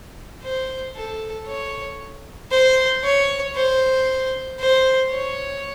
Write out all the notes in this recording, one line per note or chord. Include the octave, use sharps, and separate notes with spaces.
C5
A4
C#5
C5
C#5
C5
C5
C#5